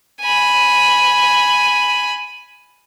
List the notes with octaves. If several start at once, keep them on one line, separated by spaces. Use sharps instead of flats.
G#5 B5